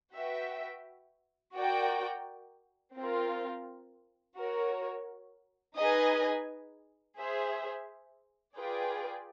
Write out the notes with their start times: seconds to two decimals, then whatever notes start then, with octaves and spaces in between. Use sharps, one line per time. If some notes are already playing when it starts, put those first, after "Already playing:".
0.15 F#4 B4 E5 G5
1.55 F#4 A#4 D5 G5
2.95 C4 F4 A#4
4.36 F#4 A#4 C#5
5.77 D#4 G#4 B4 D#5 G#5
7.17 G#4 C5 E5
8.57 F4 G#4 B4 D5 G5